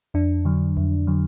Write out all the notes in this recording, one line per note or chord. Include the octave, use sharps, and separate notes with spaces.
F2 D4
D3 F#3
F2
D3 F#3